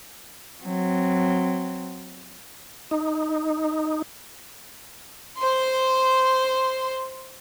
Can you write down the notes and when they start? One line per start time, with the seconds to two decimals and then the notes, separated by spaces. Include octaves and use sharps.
0.64 F#3 C4
2.91 D#4
5.39 C5 C6